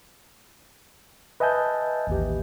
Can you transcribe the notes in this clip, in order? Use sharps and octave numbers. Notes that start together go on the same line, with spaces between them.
B4 D#5 E5 G#5 A5 G6
A1 D#2 G4